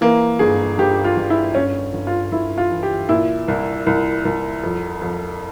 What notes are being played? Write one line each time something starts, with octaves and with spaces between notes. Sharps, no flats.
E3 A#3
G1 G#4
G1 G4
F4
G1
E4
G1 C#4
G1
F4
G1 E4
F4
E3
G4
A#2 E4
C2
C2
C2
F2
F2